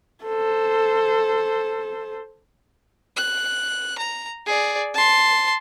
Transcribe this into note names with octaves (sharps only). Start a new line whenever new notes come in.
A4 C5
F#6
A#5
G#4 D5
A5 C6